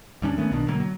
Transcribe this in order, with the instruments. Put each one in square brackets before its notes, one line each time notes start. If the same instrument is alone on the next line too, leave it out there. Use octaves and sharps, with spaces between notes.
[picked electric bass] D2 G3 C#4 D4
D#3 A3 B3 C#4
B1 B2 D#3 D4
B2 D3 F#3 A#3
F#3